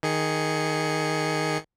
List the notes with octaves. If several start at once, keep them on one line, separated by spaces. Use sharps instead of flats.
D#3 G#4 C#7